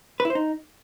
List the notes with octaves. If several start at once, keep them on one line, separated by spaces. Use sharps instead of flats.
B4
E4
C5
D#4